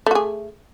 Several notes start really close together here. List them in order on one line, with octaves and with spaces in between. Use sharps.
A3 F#4 G#4